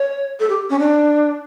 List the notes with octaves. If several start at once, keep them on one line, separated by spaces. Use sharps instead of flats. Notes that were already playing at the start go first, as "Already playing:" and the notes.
Already playing: C#5
A4
G4
C#4
D4